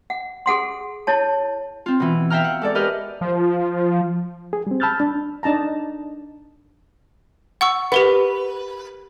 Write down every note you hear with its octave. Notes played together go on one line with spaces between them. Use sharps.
F#5
G#4 A4 F#5 C6
E4 C#5 A5
C4 F4
B2 E3
E5 F5 G5 A#5 F6
F#5
G#2 A4 D5
G4 A#4 B4 D#5 F6
F3
G#4
G3 C4
A5 B5 E6 F6 G6 A6
D4
D4 D#4 A5 A#5
F#5 C#6 E6
G4 A#4 B4 F#5